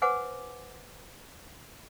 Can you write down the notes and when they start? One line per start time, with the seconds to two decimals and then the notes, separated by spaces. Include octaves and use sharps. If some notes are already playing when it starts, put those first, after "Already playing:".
0.02 B4 C5 F#5 G#5 D6